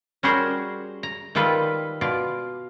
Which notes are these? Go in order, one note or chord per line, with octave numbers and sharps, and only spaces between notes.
G3 C#4 F#4 G#4 A#4 C5
A#5
D#3 G3 F4 A4 B4
B2 F4 D5